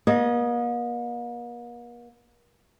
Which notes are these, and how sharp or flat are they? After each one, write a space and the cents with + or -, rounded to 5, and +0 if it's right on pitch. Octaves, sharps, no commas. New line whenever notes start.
A#3 +45 D#5 -10